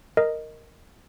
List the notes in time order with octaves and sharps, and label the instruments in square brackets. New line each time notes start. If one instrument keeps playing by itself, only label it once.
[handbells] A#4 D#5